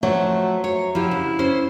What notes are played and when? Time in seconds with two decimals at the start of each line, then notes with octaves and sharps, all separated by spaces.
0.03 F3 F#3 A3
0.64 C#5
0.95 F3 E4 G4
1.11 C#3
1.39 C#4 C5